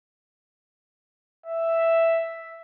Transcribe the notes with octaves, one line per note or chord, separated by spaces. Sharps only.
E5